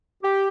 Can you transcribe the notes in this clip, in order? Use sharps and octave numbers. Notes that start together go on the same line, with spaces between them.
G4